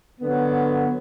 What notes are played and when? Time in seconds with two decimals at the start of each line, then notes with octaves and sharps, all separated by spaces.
0.21 D3 F#3 B3